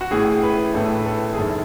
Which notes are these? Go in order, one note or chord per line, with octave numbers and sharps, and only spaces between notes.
F#4
A1 A2 E3 G#4
B4
A1 A2 E3 A4
B4
A4
G#4
F#1 F#2 D#3 A4